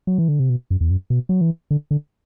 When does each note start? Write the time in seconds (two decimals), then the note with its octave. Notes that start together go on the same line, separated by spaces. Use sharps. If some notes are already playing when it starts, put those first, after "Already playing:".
0.07 F#3
0.18 E3
0.28 D3
0.40 C3
0.50 B2
0.70 F#2
0.81 E2
0.91 F#2
1.10 B2
1.29 F#3
1.41 E3
1.71 D3
1.91 D3